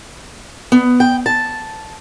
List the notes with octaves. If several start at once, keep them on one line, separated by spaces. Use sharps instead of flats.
B3
G5
A5